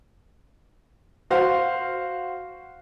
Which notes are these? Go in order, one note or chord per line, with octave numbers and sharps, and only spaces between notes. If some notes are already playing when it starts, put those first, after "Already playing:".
F#4 C5 F5